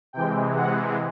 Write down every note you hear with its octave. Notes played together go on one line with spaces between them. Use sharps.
C3 E3 G#3 G5
F#5